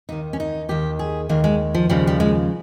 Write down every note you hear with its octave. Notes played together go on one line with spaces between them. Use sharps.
D#2 D#3 D#4
C#4
D#4
D#2 D#3 G4
G#4
D#2 D#3 A#3
G#3
F3
D#2 C#3 F3 G3
G3
G#3